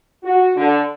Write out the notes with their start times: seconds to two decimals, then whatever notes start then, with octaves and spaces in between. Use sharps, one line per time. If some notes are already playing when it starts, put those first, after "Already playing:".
0.23 F#4
0.56 D3